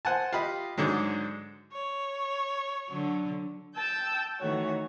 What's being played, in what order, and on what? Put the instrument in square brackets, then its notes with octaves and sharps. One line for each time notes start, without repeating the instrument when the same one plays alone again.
[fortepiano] C5 F#5 G#5 A5
F4 G4 D#5 B5
G#2 D3 F#3 G#3
[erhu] C#5
[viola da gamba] D3 F#3
[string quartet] G5 A5 E6 G6
D#3 E3 A3 F#4 C#5